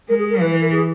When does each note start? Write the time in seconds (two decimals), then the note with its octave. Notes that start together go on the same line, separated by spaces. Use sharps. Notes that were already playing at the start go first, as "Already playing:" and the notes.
0.09 G#3 A#4
0.20 G#4
0.30 A#4
0.40 E3 B4
0.51 B4
0.61 A#4
0.72 G#4